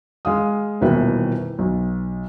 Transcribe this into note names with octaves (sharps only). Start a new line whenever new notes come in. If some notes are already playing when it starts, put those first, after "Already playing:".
G#3 F5 D#6
D#1 D#2 B2 E3 B4 E5
B1